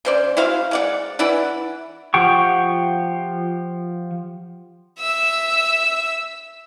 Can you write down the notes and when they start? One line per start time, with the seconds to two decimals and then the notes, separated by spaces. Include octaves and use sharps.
0.05 C#3 C5 D5
0.37 E4 F#4 C5 F5
0.71 G#3 D5 F#5
1.19 E3 E4 D5 F#5
2.14 F3 G4 F#5 G5 C#6
5.00 E5 E6